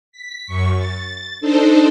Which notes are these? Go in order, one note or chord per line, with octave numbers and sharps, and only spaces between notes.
B6
F#2 C#6
A6
D4 D#4 A4 C5